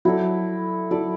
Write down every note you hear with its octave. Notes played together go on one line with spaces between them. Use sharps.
F#3 E4 A4 D5
F#3 E4 A4 D5